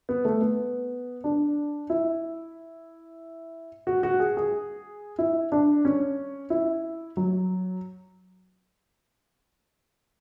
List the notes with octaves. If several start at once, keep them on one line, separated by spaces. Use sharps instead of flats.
B3
A3
B3
D4
E4
F#4
F#4
G#4
G#4
E4
D4
C#4
E4
F#3